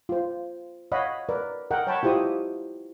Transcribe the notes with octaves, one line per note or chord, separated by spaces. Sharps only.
F4 C5
C#5 D#5 F5 F#5 B5
A#4 B4 D5
A#4 D#5 F#5 G5
C#5 F#5 G5 A5 B5 C#6
E4 F4 G4 C5 D#5 D#6